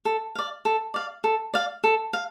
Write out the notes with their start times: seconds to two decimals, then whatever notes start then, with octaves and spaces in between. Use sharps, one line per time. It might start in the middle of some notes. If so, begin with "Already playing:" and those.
0.05 A4
0.35 D5 F5
0.65 A4
0.94 D5 F5
1.24 A4
1.54 D5 F5
1.84 A4
2.13 F5